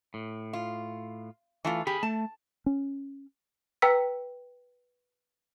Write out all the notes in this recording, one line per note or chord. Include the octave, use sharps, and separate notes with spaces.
A2
F4
E3 A3 F4
G4 G#4 B5
A3 A5
C#4
B4 G5 A#5 E6 B6